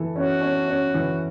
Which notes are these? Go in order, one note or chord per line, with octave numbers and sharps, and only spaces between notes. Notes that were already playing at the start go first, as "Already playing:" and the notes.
Already playing: E3 A4
C#4 F#4
C#4
C#4
E3